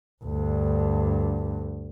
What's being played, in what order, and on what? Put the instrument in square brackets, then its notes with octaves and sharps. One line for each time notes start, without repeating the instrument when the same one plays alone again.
[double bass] D2 G2